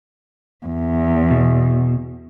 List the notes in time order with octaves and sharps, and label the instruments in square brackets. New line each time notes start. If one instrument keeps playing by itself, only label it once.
[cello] E2
[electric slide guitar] B2